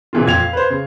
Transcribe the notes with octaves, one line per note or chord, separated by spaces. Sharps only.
A#2 C#3 E3 A#3 F4
F2 A#2 G#6 F7
F5
B4 C5
C#3